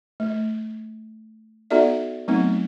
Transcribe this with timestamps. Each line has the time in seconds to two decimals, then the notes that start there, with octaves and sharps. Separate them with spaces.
0.20 A3
1.71 B3 D#4 F#4 A4 D5 E5
2.28 F#3 A3 B3 C4 D#4